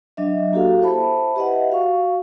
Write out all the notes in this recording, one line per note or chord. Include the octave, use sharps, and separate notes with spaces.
F#3 D4 D#5 E5
A#3 F#4 G4 A4 F5
E4 C5 E5 A5 B5
G4 B4 D#5 E5 F#5
F#4 F5 C#6